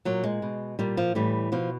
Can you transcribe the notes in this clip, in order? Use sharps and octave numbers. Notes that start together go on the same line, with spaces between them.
A#2 F#3
G#3
B2
A#2 G3
F3
A2 E3 G3
B2 F3